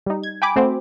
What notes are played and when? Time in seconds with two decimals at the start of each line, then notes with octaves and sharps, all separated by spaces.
0.06 G3 D#4
0.23 G#6
0.42 G5 G#5 B5 D6
0.56 A3 C4 F#4 C5